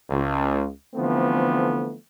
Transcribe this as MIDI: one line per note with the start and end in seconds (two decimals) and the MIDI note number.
0.10 0.68 37
0.95 1.94 50
0.95 1.94 52
0.95 1.94 53
0.95 1.94 57
0.95 1.94 59
0.95 1.94 60